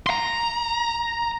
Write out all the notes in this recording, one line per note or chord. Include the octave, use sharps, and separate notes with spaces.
A#5 C6